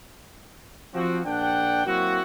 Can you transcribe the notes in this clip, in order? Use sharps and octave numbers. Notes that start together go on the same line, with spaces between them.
F3 C4 F#4
A#1 D4 F#5 G5
F#3 A#3 C4 E4 F#4